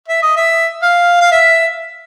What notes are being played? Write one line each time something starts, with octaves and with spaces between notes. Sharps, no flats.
E5
D#5
E5
F5
F5
E5